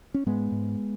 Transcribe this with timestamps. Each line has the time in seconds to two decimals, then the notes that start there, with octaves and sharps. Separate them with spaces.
0.14 C#4
0.26 G#2 G#3 B3
0.52 G#2